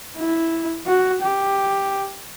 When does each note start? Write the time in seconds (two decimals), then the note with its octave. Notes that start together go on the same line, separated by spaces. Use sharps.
0.17 E4
0.86 F#4
1.22 G4